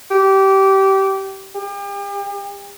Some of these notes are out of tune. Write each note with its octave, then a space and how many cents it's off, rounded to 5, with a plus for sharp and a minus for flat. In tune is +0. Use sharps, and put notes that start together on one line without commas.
G4 -20
G4 +40